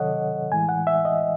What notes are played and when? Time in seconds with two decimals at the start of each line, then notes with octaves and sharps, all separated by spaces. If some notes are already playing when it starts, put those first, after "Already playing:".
Already playing: C3 D#3 F#3 A4 C#5 D#5 F#5
0.52 A2 E3 G#3 G#5
0.69 F#5
0.87 E5
1.05 D#5